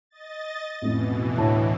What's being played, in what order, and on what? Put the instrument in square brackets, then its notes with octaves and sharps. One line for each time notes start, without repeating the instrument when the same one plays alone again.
[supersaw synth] D#5 A6
[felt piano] A1 F2 A3 [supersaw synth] B2 E3
[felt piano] D2 A5 [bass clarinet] A2